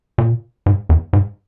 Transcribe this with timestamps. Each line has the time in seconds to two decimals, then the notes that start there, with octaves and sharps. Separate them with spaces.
0.18 A#2
0.66 G#2
0.89 E2
1.13 G#2